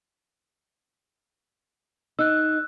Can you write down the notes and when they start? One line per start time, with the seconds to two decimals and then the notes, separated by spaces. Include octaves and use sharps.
2.19 D#4 E6 F#6